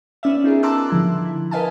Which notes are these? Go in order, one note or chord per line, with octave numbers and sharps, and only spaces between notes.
B3 C#4 D5 E5
D#4 F4 G#4 A#4
A5 A#5 C6 D6 E6 F#6
D3 F3 E4
E4
A#4 B4 D#5 F5 G#5 A5